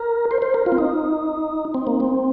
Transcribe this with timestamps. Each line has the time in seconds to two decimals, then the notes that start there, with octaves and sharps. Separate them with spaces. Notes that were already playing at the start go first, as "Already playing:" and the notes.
Already playing: A#4
0.31 C5
0.42 C5
0.54 A#4
0.66 F4
0.72 C4
0.78 D#4
1.74 C4
1.87 A#3
2.00 C4